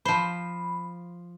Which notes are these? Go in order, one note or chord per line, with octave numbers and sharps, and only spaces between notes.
F3 C5 B5